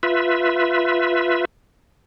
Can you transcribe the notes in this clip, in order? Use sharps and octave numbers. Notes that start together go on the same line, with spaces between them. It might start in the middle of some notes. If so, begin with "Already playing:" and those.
F4 B4 E5